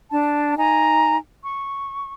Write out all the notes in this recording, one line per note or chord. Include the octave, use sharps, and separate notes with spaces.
D4 A5
D#4 G#5 A#5
C#6